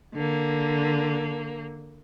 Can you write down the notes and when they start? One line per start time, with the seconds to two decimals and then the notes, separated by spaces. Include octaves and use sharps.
0.14 D3 A#3